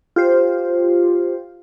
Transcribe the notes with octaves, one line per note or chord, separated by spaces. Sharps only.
F4 G4 C5